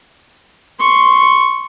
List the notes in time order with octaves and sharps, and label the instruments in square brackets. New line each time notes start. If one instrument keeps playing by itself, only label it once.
[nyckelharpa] C6 C#6